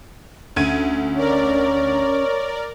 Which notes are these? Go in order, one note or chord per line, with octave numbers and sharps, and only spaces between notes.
D2 C#4 G#6 D#7
A#4 C#5 D5